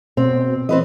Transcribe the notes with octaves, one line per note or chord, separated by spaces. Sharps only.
B2 C4
E3 C4 B4 D#5